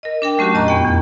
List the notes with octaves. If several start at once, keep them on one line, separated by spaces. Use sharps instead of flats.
A#4 D#5
D4 A#4 G5
F#3 A3 C#4 F#4 G4
F2 A#2 D#5 A#5 C#6 F#6
E2 B3 G5
E2